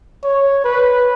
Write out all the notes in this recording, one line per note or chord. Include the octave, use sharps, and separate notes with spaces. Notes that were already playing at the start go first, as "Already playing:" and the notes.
C#5
B4